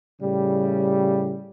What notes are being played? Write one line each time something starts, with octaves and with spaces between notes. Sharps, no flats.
A2 C#3 G3